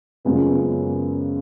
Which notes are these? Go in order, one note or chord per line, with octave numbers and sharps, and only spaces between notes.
F#2 C#3 F3 G#3 B3